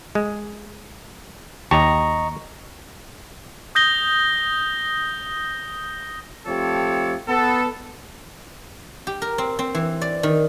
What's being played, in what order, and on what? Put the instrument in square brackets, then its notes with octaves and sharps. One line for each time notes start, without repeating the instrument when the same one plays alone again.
[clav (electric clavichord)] G#3
[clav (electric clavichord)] D#2 G4 A5 [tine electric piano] D#5 A#5 C#6
[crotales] D#6 G6 A#6 G7
[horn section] F3 A3 C4 G4 A4 C#5
B3 A4
[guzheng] G4
A#4
C4
C4
E3
D5
D#3